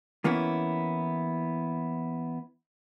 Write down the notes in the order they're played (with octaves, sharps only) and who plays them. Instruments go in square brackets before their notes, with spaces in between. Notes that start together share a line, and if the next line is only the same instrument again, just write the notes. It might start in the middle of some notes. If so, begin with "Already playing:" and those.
[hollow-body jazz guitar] E3 A#3 B3 C#4 E4